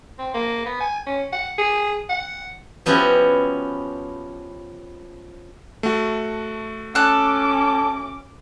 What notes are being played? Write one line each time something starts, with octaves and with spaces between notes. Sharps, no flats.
C4
A#3
B3
G#5
C#4
F#5
G#4
F#5
F3 B3 C#4 E4 F#4 G4
A3 F#4
C#4 A4 D6 F#6